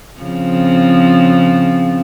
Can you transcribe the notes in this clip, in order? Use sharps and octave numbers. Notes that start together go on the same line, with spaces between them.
C#3 F3 C4